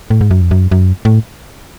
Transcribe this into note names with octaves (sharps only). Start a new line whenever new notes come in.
A2
G#2
F#2
F2
F#2
F#2
A2